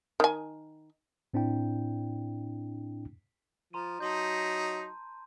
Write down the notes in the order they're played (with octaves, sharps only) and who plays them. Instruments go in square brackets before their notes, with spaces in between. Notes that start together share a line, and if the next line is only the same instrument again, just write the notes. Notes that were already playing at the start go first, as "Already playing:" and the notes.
[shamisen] D#3 G#5
[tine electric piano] A2 C4 D4 E4 G5
[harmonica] F3 [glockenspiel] A#5 C6 D#7
[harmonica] F#3 D#4 [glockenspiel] A5 C6 G6